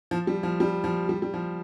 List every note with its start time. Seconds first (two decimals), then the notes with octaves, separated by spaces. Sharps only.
0.11 F3
0.27 G3
0.43 F3
0.60 G3
0.84 F3
1.09 G3
1.22 G3
1.34 F3